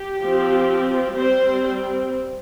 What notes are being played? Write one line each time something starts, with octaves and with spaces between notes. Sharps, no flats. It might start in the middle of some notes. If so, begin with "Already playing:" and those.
Already playing: G4
F3 C4
G3 C4 C5